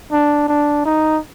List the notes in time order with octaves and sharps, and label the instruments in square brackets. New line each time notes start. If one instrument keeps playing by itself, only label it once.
[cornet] D4
D4
D#4